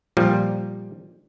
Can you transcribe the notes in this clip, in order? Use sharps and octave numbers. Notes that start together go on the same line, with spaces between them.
A#2 F3 G3